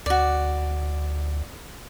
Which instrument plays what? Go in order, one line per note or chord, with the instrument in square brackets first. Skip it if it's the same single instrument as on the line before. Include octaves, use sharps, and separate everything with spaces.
[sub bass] D2 [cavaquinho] F#4 D5